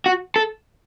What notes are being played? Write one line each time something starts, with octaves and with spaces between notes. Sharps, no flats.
F#4
A4